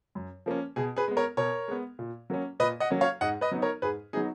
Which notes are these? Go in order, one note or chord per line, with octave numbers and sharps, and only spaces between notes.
F#2
F3 A#3 C#4
B2 G#4
G#4 B4
G#3 B3
A#4 C#5
B2 A#4 C#5
G#3 B3
A#2
F#3 A#3 C#4
A#2 B4 D#5
D#5 F#5
F#3 A#3 C#4
C#5 F5
G#2 D#5 F#5
B4 D#5
F#3 B3 D#4
A#4 C#5
G#2 G#4 B4
F#3 B3 D#4 G#4